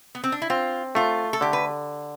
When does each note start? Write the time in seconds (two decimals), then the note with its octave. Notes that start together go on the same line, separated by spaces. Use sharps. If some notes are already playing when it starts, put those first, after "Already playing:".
0.15 B3
0.24 C4
0.32 D4
0.42 E4
0.50 C4 F4
0.95 A3 F4
1.33 A4
1.41 D3 G4
1.53 B4